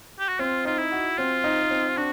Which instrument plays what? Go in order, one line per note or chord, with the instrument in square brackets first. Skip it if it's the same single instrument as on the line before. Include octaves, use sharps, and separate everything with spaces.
[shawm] G4
F#4
[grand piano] C4 [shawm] F4
[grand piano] D#4 [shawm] F4
[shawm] E4
[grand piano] F#4
[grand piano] C4 [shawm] F4
[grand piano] D#4
C4
[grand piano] D4 [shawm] F#4